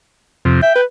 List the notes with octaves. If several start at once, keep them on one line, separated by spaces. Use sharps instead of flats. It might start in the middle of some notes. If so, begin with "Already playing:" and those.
F2 C3
E5 G5
B4